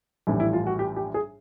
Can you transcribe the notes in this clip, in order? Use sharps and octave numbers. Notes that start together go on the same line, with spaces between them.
A#1 A2 E3 G3 E4
E4
F4
F#4
G4
G4
G#4